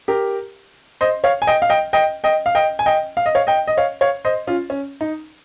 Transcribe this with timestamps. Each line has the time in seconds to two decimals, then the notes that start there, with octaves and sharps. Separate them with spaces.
0.08 G4 A#4
1.01 C5 D#5
1.24 C#5 F5
1.42 G#5
1.47 D#5 G5
1.62 F5
1.69 D#5 G5
1.93 D#5 G5
2.24 D#5 G5
2.46 F5
2.55 D#5 G5
2.79 G#5
2.86 D#5 G5
3.17 F5
3.26 D#5
3.35 C#5 F5
3.47 D#5 G5
3.67 D#5
3.77 C#5 F5
4.01 C#5 F5
4.25 C5 D#5
4.47 C#4 F4
4.70 C#4
5.01 D#4